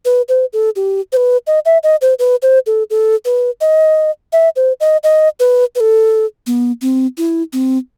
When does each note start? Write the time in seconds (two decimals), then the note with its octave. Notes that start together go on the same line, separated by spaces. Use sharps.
0.05 B4
0.29 C5
0.53 A4
0.76 G4
1.13 C5
1.17 B4
1.47 D#5
1.65 E5
1.83 D#5
2.02 C5
2.19 B4
2.42 C5
2.67 A4
2.90 A4
3.25 B4
3.61 D#5
4.33 E5
4.56 C5
4.81 D#5
5.04 D#5
5.40 B4
5.76 B4
5.80 A4
6.47 B3
6.82 C4
7.18 E4
7.53 C4